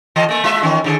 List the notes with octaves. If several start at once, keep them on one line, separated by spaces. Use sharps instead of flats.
E3 A4 D#5
A3 A#3
G#3 F4 E5
D#3 E3 C#4
D3 D#3 G#4